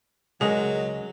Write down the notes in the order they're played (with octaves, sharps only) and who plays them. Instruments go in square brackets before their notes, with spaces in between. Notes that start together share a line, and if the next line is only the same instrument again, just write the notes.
[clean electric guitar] C#2 C#3 D#5 [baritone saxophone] F#3 [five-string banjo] G#3 A#4 [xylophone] G#4